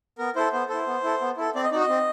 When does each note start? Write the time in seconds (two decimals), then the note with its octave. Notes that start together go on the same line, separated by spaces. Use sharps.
0.18 B3 A#4
0.36 E4 A4 C5
0.52 B3 C5
0.69 E4 A4 C5
0.87 B3
1.04 E4 A4
1.21 B3
1.37 E4 A4
1.55 C4 D5
1.63 D#5
1.71 D#4 F#4 D5
1.80 D#5
1.88 C4